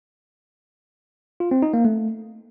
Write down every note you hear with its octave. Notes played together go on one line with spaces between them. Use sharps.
F4
C4
D#4
A#3
A3